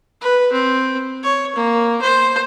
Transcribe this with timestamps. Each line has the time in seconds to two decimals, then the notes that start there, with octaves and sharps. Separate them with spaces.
0.21 B4
0.52 C4
1.23 C#5
1.55 A#3
2.01 C5